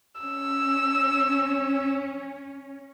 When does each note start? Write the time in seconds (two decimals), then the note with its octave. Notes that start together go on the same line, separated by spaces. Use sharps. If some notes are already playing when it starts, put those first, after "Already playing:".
0.21 C#4 E6